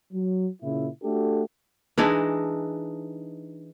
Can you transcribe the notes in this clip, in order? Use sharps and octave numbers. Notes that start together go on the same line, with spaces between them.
F#3
A#2 C#3 E4
A3 D4 F#4 G4 A4
E3 G#3 D4 D#4